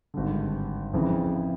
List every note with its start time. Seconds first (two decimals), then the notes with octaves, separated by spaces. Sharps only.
0.14 G#1 G2 D3
0.93 F2 C#3 E3